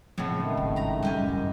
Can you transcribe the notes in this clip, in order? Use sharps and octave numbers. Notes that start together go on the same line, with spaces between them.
F2 A2 C#3 F3 B3
D#3 G#3 A3 D#4
G#1 F3
A#5 B5
F#2 G3 G4 G#5
G2 D#3 G#3